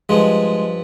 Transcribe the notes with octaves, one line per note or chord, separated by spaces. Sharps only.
G2 F3 G#3